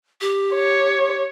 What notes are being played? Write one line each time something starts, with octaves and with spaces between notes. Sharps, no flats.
G4
C#5